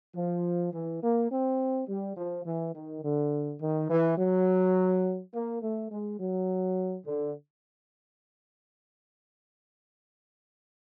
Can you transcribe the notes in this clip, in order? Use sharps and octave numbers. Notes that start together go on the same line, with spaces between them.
F3
E3
A#3
C4
G3
F3
E3
D#3
D3
D#3
E3
F#3
A#3
A3
G#3
F#3
D3